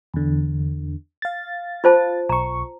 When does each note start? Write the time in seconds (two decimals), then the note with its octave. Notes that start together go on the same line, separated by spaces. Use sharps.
0.14 E2 D3
1.22 F5 A6
1.84 F4 C5 A5
2.29 B1 A#5 C#6